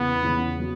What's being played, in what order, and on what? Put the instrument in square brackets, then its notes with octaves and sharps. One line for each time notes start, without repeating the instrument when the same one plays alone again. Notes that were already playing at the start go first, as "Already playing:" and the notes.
Already playing: [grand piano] E2 C#3 E3 [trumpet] B3
[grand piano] E2 C#3 E3
F#3